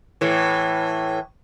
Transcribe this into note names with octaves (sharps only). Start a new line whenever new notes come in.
A2 E3